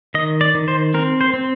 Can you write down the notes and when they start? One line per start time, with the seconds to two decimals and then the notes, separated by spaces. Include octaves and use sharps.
0.14 D#3 D#5
0.41 D5
0.55 D#3
0.68 C5
0.94 C4 A#4
1.21 C5
1.34 C4